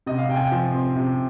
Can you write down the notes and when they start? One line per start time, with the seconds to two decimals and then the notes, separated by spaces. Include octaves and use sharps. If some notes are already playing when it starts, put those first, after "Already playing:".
0.06 C3 D#5
0.18 F5
0.29 C3 G5
0.36 G#5
0.40 G5
0.52 F3
0.74 C4
0.96 C3